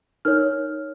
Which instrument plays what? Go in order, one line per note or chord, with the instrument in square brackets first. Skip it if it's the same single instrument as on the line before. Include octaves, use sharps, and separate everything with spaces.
[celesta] D#4 A#4 C#5 F6